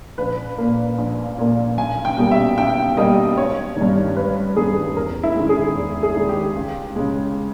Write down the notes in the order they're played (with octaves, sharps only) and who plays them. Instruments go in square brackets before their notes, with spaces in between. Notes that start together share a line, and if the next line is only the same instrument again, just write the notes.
[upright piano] A#1 B4
A#2 A#3
A#1
A#2 A#3
B1 G#5
G5
B2 G3 A#3
E5
B1 G5
B2 G3 A#3 D#5
G#1 C#5
G2 D#3
G#1 B4
G2 D#3 G#4
E2 A#4
E4
D#3 G#3
G#4
E2
G#4
D#3 G#3
G4
C#2
C#3 G#3